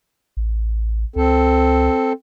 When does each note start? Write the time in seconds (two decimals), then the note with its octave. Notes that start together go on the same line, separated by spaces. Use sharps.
0.37 A1
1.16 C#2 C4 A4